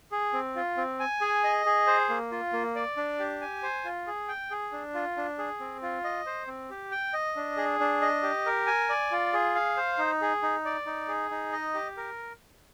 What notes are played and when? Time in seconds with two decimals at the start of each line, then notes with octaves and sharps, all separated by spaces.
0.12 G#4
0.33 C4
0.56 F4
0.77 C4
1.00 G#5
1.21 G#4
1.44 D#5
1.66 G#4
1.87 C5
2.09 A#3
2.32 F4
2.53 A#3
2.76 D5
2.97 D4
3.19 G4
3.41 G#5
3.63 C5
3.85 F4
4.07 G#4
4.28 G5
4.51 G#4
4.72 D4
4.94 F4
5.17 D4
5.39 G#4
5.60 C4
5.82 F4
6.04 D#5
6.26 C5
6.47 C4
6.70 G4
6.91 G5
7.13 D#5
7.36 D4
7.57 G#4
7.80 D4
8.02 D#5
8.23 G4
8.46 A#4
8.67 G#5
8.89 D5
9.11 F4
9.33 G#4
9.55 F5
9.77 C5
9.98 D#4
10.22 G#4
10.43 D#4
10.65 D5
10.86 D#4
11.08 G#4
11.31 D#4
11.52 D#5
11.74 G4
11.97 A#4